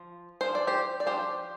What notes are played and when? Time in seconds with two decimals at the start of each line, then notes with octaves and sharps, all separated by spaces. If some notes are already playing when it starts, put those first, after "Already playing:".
Already playing: F3
0.41 F3 D4 C5
0.55 D5
0.67 G4 C5
1.00 D5
1.06 F3 D4 G4 C5